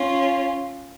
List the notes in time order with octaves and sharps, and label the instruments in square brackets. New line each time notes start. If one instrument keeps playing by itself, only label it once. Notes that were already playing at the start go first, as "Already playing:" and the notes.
Already playing: [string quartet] C#4 F4